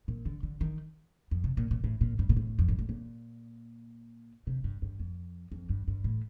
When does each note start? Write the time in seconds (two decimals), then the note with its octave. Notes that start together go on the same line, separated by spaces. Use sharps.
0.08 A#2
0.26 D3
0.43 D3
0.61 D#3
1.31 F2
1.44 C3
1.57 A#2
1.71 A#2
1.84 A2
2.01 A#2
2.19 G2
2.29 A#2
2.37 A2
2.59 F2
2.68 G2
2.79 A2
2.89 A#2
4.47 C3
4.64 G2
4.82 G2
5.00 F2
5.52 F2
5.70 G2
5.88 G2
6.04 A2